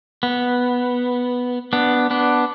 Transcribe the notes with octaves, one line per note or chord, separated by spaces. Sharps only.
B3
B3 D4
B3 D4